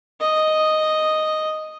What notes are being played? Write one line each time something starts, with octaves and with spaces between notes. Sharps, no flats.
D#5